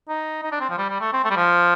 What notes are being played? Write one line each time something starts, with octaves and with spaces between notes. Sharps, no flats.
D#4
D#4
D4
C4
F3
G3
G3
A3
C4
A3
G3
F3